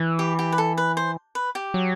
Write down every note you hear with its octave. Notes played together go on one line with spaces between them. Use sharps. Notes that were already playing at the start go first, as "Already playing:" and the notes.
Already playing: E3
G4
G4
B4
A4
B4
C5
B4
G4
F#3